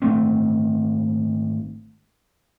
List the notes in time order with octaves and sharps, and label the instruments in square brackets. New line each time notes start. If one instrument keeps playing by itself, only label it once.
[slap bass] G#1 A3 C4